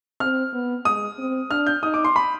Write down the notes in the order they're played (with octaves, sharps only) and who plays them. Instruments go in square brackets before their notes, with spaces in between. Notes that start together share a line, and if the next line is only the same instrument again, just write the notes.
[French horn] C4 [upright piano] F6
[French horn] B3
[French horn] G#3 [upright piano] D#6
[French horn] C4
[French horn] D4 [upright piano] F6
[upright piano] G6
[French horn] D#4 [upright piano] D#6
[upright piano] D6
C6
B5